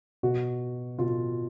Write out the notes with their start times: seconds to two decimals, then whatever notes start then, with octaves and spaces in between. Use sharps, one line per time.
0.23 B2 F#4
0.99 B2 F4